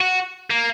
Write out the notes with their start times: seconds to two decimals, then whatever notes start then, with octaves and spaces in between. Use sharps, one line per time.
0.01 F#4
0.50 A#3